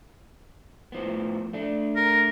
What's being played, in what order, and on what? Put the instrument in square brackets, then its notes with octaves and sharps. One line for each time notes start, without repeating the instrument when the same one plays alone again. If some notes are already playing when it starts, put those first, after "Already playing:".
[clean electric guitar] A2 F3 B3
A3 D4
[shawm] A#4